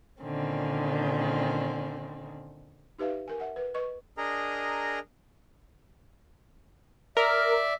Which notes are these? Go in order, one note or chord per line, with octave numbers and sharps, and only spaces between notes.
A#2 D3 D#3 C4 C#4
D#4 G4 B4 E5 F5
A#4 G#5
E5 F#5
B4
B4 D#5 C#6
D4 G#4 A#4 D#5 A#5
A#4 D5 E5